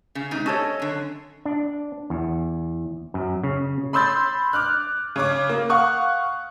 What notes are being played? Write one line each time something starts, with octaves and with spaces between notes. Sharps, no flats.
C#3
G#2 C3 D#4
C#4 A4 C#5 D#5
F#2 D3
D4
E2
F#2
C#3
B5 C6 E6 G6 A6
D6 F6 F#6
C#3 C#5 D6
A#3
F5 F#5 C#6 D#6 F#6